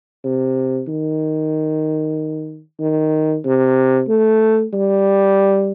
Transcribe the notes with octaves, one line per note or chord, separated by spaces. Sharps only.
C3
D#3
D#3
C3
A3
G3